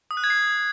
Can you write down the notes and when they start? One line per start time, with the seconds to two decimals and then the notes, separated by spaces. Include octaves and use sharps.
0.11 D#6
0.17 F#6
0.24 G#6
0.30 C7